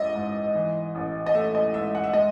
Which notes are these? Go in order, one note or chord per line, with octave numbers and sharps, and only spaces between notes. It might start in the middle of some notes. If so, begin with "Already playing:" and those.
Already playing: A1 G#3 D#5 E5
G#2
E3
A1
D#5
A3 E5
D#5
G#2 E5
F#5
E5
G#3 D#5